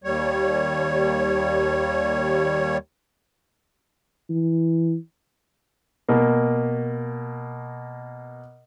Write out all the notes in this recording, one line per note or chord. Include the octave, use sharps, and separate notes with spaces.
D#2 G3 C#5
E3
B2 A#3